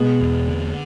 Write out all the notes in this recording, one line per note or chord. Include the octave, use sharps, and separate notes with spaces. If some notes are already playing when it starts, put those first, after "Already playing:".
Already playing: B2 G#3 B3
E2
D3